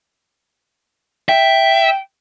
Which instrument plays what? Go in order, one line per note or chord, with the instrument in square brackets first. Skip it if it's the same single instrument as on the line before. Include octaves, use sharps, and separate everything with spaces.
[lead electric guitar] E5 [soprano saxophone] G5